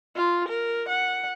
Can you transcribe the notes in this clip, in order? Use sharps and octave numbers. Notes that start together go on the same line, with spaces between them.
F4
A#4
F#5